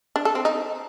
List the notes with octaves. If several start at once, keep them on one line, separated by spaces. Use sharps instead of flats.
D4
A4
C4
D#4